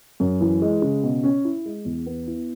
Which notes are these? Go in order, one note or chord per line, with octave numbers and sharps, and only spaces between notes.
F#2
E3
G#3
C#3
B2
C#4
E4
G#3
E2
B3
E4